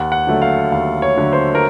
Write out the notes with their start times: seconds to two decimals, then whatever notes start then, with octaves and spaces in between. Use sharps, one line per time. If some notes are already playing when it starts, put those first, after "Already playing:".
Already playing: D#2 F#5
0.12 F#5
0.27 D3 F#3 A3
0.42 F5
0.72 D#2 F5
1.02 C#5
1.17 D3 F#3 A3
1.33 C5
1.55 A#4